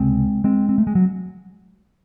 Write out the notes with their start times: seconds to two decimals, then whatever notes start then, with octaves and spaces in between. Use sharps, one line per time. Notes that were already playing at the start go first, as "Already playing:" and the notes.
Already playing: C#2 C3 G#3 C4
0.44 G#3 C4
0.69 C4
0.78 A3
0.87 G#3
0.95 F#3